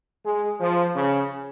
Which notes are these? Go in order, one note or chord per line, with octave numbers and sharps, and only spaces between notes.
G#3
F3
C#3